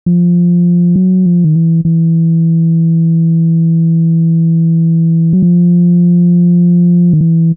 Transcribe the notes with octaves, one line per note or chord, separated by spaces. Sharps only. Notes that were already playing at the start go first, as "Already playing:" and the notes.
F3
F#3
F3
D#3
E3
E3
F#3
F3
D#3
E3